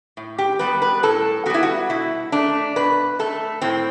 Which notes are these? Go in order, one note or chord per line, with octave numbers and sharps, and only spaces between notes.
A2
G4
G3 B3 B4
B4
A2 A4
G3 B3 E4 F#4
F#4
B2 E4
A3 D4
B2 B4
A3 A4
A2 C4